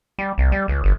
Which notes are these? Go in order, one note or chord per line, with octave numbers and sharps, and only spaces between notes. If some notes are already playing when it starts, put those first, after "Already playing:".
G3
C2
G3
C#2
G1